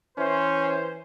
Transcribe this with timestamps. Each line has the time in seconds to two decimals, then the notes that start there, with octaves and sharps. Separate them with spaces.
0.18 E3 C#4 C5